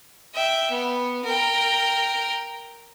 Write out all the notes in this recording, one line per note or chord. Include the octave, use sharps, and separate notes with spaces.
E5 G5
B3
A#4 G5